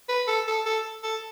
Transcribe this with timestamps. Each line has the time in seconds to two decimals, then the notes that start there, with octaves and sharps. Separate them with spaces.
0.09 B4
0.28 A4
0.48 A4
0.66 A4
1.03 A4